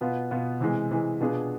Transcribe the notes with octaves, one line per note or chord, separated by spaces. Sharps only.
B2 B3 F4
B2 B3 F4
C3 E3 G#3
C3 E3 G#3
B2 B3 D4 F4 G#4